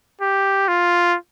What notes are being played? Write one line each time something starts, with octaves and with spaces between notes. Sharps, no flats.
G4
F4